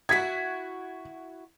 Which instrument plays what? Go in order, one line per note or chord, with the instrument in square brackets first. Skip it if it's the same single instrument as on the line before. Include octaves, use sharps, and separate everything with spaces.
[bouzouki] E4 F#4 [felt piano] G#6 B6